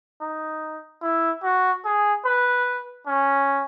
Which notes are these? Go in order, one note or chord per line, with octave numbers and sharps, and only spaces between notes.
D#4
E4
F#4
G#4
B4
C#4